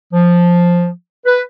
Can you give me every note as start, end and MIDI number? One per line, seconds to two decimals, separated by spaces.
0.13 0.88 53
1.26 1.40 71